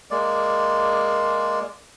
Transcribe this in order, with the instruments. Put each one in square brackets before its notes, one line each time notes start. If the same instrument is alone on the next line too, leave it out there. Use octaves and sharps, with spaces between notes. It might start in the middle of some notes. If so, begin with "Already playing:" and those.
[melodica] G#3 A#3 D5